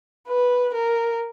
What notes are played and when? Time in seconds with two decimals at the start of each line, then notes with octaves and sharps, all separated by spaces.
0.28 B4
0.74 A#4